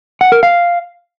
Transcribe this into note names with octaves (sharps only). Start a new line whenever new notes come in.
F#5
A#4
F5